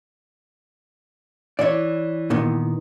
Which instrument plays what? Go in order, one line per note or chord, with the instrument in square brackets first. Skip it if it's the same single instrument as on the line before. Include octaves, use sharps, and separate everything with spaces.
[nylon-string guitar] E3 [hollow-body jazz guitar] C#5 D5
[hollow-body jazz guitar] A#2 D#3 B3